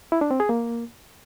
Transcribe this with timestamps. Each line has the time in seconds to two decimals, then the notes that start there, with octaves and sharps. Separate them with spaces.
0.12 E4
0.21 D4
0.31 C4
0.40 G#4
0.49 A#3